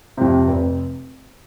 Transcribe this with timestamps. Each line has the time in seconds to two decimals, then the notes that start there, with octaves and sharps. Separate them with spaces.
0.17 F2 C3
0.47 F1